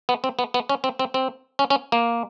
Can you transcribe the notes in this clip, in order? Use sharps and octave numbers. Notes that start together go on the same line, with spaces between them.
B3
C4
B3
B3
C#4
C4
C4
C4
C#4
C#4
A#3